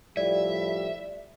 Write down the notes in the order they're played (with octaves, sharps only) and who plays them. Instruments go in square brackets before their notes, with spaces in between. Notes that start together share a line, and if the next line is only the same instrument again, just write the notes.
[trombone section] A2 F3 G3 [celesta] D5 [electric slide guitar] E5